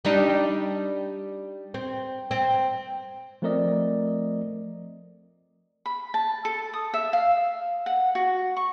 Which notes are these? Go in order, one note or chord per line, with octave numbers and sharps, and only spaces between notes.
G3 D4 D#4
C4
C4
F3 A3 C4 A#4 D5 D#5
B5
A5
A4
D#6
E5
F5
F#5
F#4
C#6